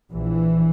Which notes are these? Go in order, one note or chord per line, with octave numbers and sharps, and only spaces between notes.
A#1 E3